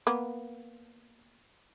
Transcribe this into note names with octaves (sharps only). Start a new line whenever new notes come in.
A#3 B3